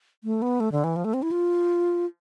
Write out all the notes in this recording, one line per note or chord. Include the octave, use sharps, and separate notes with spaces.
A3
B3
A3
D3
E3
F3
A3
C4
E4
F4